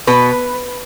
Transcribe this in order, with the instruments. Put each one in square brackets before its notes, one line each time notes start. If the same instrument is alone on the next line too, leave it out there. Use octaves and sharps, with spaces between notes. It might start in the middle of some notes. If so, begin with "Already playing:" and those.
[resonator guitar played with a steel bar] B2 B4